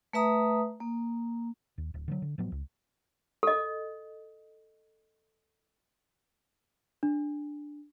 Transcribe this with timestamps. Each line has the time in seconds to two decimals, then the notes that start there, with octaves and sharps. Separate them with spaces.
0.13 A3 B4 E5 A#5 D#6
0.80 A#3
1.78 D#2
1.94 D1
2.08 D3 F3 F#3
2.22 D3
2.38 A2 F3 F#3 B3
2.52 C#2
3.43 A4 D#5
7.03 D4